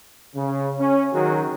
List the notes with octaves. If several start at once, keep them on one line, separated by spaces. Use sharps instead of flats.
C#3
C#4
D#3 F#3 F#4 G#4